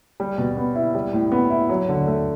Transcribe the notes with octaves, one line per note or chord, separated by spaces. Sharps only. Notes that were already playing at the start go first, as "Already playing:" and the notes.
G3
B2
B3
E4
G3
A2
B3
E4
F#3
D3
A3